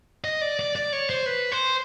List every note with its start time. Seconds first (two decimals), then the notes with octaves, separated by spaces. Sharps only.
0.24 D#5
0.41 D5
0.59 D5
0.76 D5
0.93 C#5
1.10 C5
1.26 B4
1.52 C5